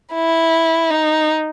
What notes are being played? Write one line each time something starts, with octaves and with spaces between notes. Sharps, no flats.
E4
D#4